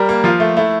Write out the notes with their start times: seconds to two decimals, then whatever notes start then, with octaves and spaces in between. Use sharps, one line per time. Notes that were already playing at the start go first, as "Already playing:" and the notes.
Already playing: G3 A#4
0.09 A#3
0.24 F3 F4
0.40 A3
0.57 A3 E4